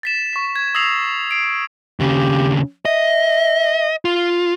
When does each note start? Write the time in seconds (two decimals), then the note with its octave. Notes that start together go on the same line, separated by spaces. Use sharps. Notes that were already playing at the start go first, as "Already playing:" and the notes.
0.03 A6 B6 E7
0.33 C#6 B6
0.56 G#6
0.75 D#6 E6 A#6 C7 F7 F#7
1.31 C7 D7
2.00 D#2 C#3 G4
2.85 D#5 E5
4.05 F4